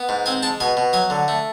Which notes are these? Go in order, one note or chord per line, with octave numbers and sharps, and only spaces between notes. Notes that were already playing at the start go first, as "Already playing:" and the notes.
Already playing: B3
G#2
C4 G#5
G#3 A5
B2 G#5
B2
F#3 G#5
D3
A3